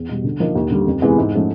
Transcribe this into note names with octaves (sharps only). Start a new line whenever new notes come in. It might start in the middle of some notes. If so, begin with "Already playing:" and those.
Already playing: E2
B2 G3
D3
F3 A#3 D#4
D#2
D3 G3
F2
C3 E3 G#3 B3
G#2
F3 A3 C#4